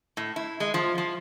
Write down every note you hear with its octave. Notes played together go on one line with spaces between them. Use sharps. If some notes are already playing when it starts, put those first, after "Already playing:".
A2
E4
G#3
F3
F3